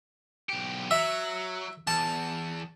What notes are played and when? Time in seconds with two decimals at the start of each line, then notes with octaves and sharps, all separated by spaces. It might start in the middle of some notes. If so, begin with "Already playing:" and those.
0.49 B1 G4
0.91 F#3 E5
1.87 E2 A5